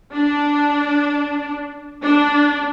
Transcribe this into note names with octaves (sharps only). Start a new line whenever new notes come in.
D4
D4